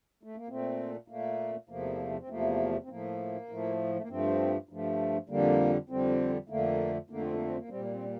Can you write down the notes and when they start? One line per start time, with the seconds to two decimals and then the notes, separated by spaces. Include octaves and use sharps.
0.23 A3
0.36 A#3
0.49 A#2 A3 C4
1.08 A#2 A3 A#3
1.69 E2 C3 F3 A3 A#3
2.19 C4
2.29 E2 C3 F3 A3 A#3
2.84 C4
2.89 A2 F3 A3 A#3
3.49 A2 F3 A3
3.95 A3
4.02 A#3
4.09 G2 F3 A3 C4
4.69 G2 F3 A3
5.29 F2 D3 G3 A#3
5.89 F2 D3 G3 C4
6.49 F2 D3 A3 A#3
7.10 F2 D3 A3 A#3
7.21 C4
7.33 A#3
7.45 C4
7.57 A#3
7.69 A#2 G3 C4
7.80 A#3
7.92 C4
8.05 A#3